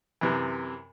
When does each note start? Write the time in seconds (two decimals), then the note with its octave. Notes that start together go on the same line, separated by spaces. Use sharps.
0.21 F#2 C3 E3